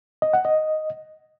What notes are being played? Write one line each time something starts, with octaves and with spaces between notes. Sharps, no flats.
D#5
F#5
D#5